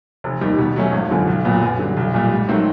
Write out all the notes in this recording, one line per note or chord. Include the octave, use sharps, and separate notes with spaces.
F1
D#2 D#3 G3
B2
F#3 A3 C#4
G#1
F#2 D3 F3
B1
A#2 F#3 B3
F#2
D3 G3
B1
A#2 G3
G#2
D#3 F#3 A3 C4